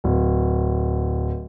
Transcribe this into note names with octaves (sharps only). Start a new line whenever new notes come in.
D1